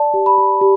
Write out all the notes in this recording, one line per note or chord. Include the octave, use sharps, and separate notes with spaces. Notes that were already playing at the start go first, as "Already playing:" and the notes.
Already playing: D5 A5
G4
B5
G4
G4